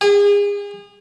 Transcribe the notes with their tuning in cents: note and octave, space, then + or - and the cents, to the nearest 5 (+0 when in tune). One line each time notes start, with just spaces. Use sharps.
G#4 -35